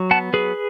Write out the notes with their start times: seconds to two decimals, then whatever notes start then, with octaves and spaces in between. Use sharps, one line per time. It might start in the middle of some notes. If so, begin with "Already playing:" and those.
Already playing: F#3
0.11 B3 F#5 A5
0.33 F#3 G#4 B4